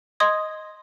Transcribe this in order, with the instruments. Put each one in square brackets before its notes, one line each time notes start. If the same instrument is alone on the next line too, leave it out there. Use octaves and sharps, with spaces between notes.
[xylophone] D#5 C6 D#6 G#6